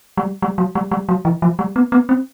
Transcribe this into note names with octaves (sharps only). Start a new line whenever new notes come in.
G3
G3
F#3
G3
G3
F#3
E3
F3
G3
B3
B3
C4